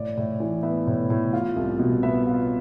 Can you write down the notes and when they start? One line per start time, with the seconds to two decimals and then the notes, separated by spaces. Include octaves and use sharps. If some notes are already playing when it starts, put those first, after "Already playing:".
Already playing: A2 D5
0.17 A2
0.40 E3
0.63 B3 E5
0.87 A2
1.10 A2
1.33 F4
1.56 C2
1.79 B2
2.03 B3 E5
2.27 F4